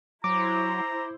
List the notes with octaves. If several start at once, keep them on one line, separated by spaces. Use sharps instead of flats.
F#3 E4 C5 A#5 D6